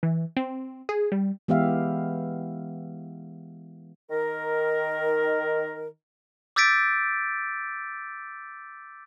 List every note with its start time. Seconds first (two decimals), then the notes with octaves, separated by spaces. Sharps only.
0.03 E3
0.37 C4
0.89 G#4
1.12 G3
1.48 E3 G#3 B3 G4 E5 F5
4.11 D#3 A#4
6.56 D6 E6 G6 A6 B6 D7